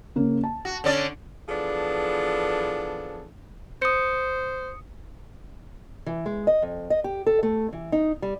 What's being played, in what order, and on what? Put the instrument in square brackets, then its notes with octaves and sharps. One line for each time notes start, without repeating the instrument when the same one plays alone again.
[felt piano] C#3 A#3
A5
[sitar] F#4
D3 C#4 D5
[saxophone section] E3 F3 B3 D4 G#4 A4
[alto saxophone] C5 [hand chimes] D#6 C#7
[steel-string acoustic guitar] E3
G#3
D#5
F2
D#5
G4
A4
A3
E3
D#4
G3